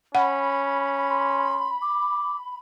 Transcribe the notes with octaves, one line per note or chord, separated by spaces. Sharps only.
C#4 F#5 B5
C6
D6